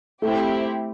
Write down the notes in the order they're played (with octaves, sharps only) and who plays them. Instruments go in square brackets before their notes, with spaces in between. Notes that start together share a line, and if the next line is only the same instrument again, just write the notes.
[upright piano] A3 [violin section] C4 E4 G4